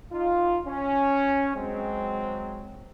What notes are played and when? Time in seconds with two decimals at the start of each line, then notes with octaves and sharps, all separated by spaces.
0.11 D#4 F4
0.66 C#4
1.56 F#3 G#3 C4